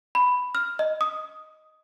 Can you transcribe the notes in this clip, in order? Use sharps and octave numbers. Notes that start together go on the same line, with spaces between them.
B5
F6
D#5
D#6